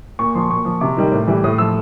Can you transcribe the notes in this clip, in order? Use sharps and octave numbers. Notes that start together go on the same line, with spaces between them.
A#2 C#6
F3 C6
A#2 C#6
F3
C3 D6
D#3 G3
A2
E3 G3
A2 D#6
F3 E6